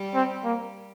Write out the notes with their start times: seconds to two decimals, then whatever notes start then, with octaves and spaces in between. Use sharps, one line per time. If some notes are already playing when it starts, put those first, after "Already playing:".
Already playing: G3
0.14 C4
0.44 A#3